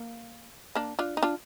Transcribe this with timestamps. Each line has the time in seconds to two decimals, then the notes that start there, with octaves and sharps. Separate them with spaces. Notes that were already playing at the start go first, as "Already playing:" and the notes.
Already playing: A#3
0.75 A#3 D4
0.99 D4 F4
1.17 D#4
1.23 D4 F4